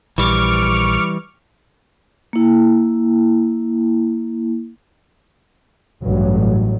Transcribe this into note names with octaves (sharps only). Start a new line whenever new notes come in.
A#1 E3 G3 C#6 D6 F6
A#3 E4
A1 G2 F#3